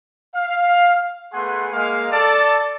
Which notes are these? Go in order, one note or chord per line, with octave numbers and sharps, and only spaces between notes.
F5
A3 B3 G#4 F#5 G#5 C6
G#3 A#3 F5
A4 D5 A5